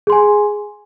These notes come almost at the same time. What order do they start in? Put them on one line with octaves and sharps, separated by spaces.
G#4 C6 G#5